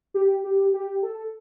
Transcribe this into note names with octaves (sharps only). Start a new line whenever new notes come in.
G4
G4
G4
A4